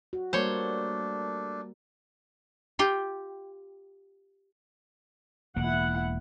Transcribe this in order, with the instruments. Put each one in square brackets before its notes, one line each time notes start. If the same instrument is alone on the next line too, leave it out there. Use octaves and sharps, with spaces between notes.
[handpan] F#4
[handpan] G3 A#3 A#4 [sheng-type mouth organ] A3 D4 [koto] C5 C#5
[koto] F4 G4 G5
[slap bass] E1 A#3 [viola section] E4 F#5